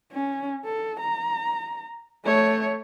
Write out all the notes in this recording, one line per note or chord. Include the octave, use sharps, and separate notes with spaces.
C#4
A4
A#5
A3 C#5